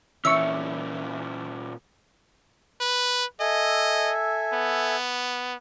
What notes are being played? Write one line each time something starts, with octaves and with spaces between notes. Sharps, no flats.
A#2 E3 C#4 E5 C#6
B4
A4 D#5 E5 G#5
B3